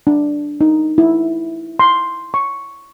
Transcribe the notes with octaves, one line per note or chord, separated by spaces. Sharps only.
D4
D#4
E4
C6
C#6